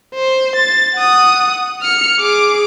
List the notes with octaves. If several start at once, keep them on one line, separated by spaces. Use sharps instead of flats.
C5
A6
F#5 D#6
F6 C#7
G#4 D6